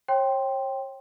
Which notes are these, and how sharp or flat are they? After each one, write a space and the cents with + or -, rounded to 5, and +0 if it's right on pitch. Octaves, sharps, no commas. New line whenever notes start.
C#5 -40 G5 +0 C6 +0